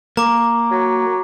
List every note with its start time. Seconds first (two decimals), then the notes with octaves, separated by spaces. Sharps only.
0.17 A#3 A#5 D6
0.71 F#3